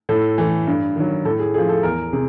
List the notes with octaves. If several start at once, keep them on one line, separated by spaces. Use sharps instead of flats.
A2 A4
E3 A3
G2
D#3 F#3
A2 A4
G#4
F3 A3 G#4
A4
E2 A#4
C3 G#4